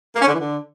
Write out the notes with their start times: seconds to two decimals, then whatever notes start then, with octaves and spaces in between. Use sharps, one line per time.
0.16 A#3
0.22 C#4
0.28 D3
0.34 E3
0.40 D3